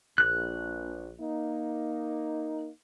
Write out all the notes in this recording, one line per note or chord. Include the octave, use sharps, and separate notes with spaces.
A#1 F#6
A#3 D#4